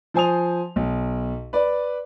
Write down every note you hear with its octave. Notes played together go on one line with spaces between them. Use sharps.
F3 C5 G#5 D#6 F7
B1
B4 D5